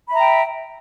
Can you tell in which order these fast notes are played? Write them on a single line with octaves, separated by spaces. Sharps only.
B5 E5 A#5 G5